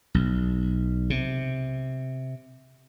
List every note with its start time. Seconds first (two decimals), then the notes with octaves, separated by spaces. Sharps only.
0.14 B1
1.10 C3